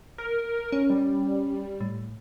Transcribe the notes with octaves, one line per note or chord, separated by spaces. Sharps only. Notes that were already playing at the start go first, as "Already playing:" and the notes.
A#4
C#4
G3
A2